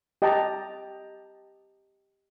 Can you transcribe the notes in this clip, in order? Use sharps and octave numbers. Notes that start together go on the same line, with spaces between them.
G4 D#5 G5 A5 A#5